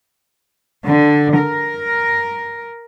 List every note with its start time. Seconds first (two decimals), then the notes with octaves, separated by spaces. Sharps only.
0.87 D3
1.38 A#4